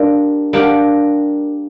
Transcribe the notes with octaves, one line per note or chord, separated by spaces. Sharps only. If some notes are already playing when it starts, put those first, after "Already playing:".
Already playing: G3 A#3 D4 A#4
G3 A#3 D4 G4 A#4